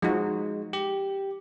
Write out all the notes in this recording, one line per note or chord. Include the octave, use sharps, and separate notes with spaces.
F3 G#3 D#4 F#4
G4